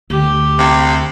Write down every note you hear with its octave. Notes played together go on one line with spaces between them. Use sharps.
D2 G4
C3